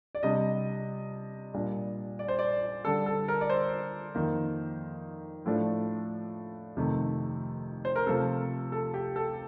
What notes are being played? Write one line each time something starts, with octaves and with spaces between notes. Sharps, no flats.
D5
C3 G3 D4 D#5
A#2 G3 D4
D5
C5
D5
D3 G3 D4 A4
A4
A#4
D5
C5
F2 D#3 A#3
A2 F3 A3 D4
F2 C3 D#3 A3
C5
A#4
C3 F3 A3 C4 A4
A4
G4
A4